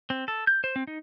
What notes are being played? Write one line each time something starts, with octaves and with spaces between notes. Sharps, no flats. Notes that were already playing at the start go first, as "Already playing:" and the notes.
C4
A4
G6
C5
C4
D#4